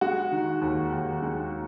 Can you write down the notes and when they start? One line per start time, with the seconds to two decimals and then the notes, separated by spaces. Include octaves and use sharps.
0.01 G#3 F#4
0.32 D#3
0.62 D#2
0.92 D#2
1.23 G#3